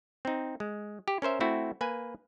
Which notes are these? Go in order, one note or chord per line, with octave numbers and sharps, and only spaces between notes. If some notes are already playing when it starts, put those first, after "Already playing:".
C4 D#4
G#3
G4
C#4 A#4 C5 E5
A3 C4 E4 F#4
A#3 B4 G#5